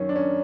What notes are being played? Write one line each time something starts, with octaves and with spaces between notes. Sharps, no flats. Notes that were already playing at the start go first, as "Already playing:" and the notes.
Already playing: F#2 D#3 C#4
D4
C#4